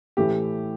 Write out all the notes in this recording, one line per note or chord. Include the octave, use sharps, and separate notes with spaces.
A2 E3 A3 G4